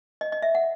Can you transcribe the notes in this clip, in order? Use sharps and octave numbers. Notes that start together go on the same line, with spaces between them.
D#5
D#5
E5
F#5